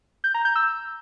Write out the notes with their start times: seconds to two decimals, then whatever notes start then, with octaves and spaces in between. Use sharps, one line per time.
0.24 G6
0.34 A#5
0.45 G6
0.56 E6